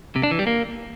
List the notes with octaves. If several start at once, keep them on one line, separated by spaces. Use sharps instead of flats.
C3
D4
E3
G3
A#3